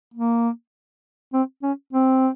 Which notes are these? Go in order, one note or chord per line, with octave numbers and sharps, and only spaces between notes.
A#3
C4
C#4
C4